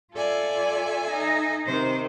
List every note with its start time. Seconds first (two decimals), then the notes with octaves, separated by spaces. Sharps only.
0.13 F4 A4 D5 E5 G#5
1.11 D#4
1.66 C3 D#3 C5